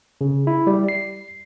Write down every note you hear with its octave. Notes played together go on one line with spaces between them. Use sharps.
C#3
E4
G3
C7